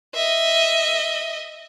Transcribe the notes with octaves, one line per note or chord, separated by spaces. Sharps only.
D#5 E5